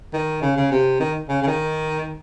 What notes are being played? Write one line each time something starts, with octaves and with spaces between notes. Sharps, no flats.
D#3
C#3
C#3
C3
D#3
C#3
C#3
D#3